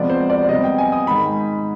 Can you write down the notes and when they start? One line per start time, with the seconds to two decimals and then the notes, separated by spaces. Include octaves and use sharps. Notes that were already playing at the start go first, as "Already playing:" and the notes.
Already playing: C3 F3 G#3 B3 D5
0.10 C5
0.30 D5
0.43 D5
0.49 C3 G3 B3 D#5
0.64 G5
0.78 G#5
0.92 D#6
1.07 G#2 D#3 G#3 B5